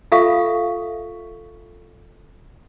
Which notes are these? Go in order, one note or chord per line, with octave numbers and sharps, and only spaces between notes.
F4 A4 E5 F5 C#6